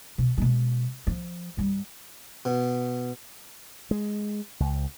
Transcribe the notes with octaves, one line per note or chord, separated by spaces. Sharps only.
B2
B2 G#3
F3
G2 G3
B2
G#3
C#2